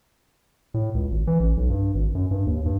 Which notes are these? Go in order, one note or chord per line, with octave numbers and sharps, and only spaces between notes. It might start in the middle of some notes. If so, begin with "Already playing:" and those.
A2
C#2
G#1
E3
A1
B1
G2
G#1
F#2
G2
D#2
G2